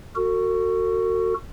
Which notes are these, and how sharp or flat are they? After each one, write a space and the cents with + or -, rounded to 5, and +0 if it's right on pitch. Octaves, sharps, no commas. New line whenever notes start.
F#4 +0 A4 +45